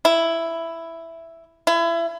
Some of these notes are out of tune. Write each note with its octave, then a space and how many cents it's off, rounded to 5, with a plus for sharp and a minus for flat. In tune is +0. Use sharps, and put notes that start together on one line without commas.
E4 +5
E4 +30